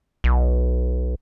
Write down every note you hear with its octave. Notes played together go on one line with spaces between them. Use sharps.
B1